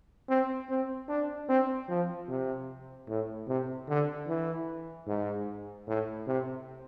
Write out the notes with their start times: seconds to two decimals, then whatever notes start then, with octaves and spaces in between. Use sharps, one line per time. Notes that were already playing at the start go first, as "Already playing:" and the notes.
0.29 C4
0.69 C4
1.09 D4
1.49 C4
1.89 F3
2.28 C3
3.08 A2
3.48 C3
3.88 D3
4.28 E3
5.07 G#2
5.88 A2
6.27 C3